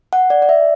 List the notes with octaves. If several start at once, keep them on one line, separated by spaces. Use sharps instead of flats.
F#5
D5
D5
E5